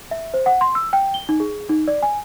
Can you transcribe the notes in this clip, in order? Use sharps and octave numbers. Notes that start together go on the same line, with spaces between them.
E5
C5
F#5
C6
E6
G5
G7
D#4
G#4
D#4
D5
G#5